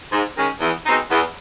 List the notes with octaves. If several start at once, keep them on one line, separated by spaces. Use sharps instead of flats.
G#2
D#3 G#3 C#4
E2
B2 G#3 C4 D#4
E2